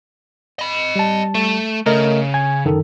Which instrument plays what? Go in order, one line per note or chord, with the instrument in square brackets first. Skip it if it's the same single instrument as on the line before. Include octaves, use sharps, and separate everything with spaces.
[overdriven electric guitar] D#5 B5
[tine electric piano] G3 A5
[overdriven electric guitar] A3
[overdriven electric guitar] C#3 [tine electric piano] A3 A#4 D#5
[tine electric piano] G#5 G#6
F#2 D#3 A4